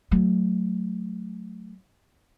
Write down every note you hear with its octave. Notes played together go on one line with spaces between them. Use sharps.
F#3 A3